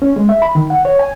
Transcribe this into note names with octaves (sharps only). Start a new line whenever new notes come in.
C#4
G#3
E5
B5
D#3
F#5
C#5
G#5